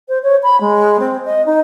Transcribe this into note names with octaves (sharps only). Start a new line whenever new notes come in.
C5
C#5
B5
G#3
C4
D#5
D#4